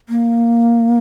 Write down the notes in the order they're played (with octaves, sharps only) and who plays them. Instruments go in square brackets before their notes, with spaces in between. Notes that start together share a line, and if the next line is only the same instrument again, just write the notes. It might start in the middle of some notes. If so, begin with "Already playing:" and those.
[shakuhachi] A#3